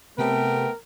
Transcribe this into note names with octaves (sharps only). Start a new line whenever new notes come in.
C3 A3 B3 A#4 G5